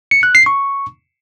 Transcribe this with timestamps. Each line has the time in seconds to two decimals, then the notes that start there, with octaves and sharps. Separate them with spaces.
0.11 C#7
0.23 F#6
0.35 C7
0.46 C#6